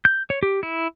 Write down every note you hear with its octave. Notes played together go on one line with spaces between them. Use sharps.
G6
C#5
G4
E4